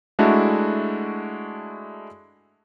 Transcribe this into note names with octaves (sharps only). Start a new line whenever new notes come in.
G#3 A3 D4 E4 F#4